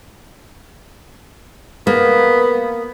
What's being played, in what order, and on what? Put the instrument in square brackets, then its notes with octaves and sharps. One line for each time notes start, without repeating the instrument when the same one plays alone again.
[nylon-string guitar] A#3 [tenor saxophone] B3